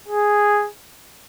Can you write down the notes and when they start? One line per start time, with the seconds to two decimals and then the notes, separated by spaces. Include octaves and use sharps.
0.08 G#4